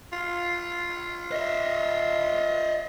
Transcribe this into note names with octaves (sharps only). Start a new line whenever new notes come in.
F4
D#5 E5